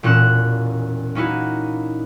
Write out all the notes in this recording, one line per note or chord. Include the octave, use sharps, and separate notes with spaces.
E1 A#2 C#4 F#6 E7
A#3 C#4 D#4 E4 F#4